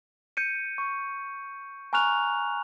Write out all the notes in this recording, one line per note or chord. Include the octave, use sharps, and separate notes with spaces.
G6 C#7 D#7
C#6
G#5 A#5 C#6 F6 F#6 F7